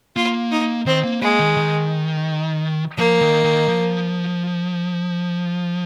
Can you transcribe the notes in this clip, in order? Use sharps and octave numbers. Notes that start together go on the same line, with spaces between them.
A#3 F4
D#4
D#3 C4
A#3
G#3 A#3
D#3
D#3
F3 A#3
D#3
D#3
F3